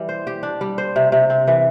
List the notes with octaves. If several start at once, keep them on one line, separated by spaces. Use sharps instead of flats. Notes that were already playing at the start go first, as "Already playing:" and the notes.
Already playing: E3 G3
C5
G4
D4
G3
C5
C3
C3
C4
E3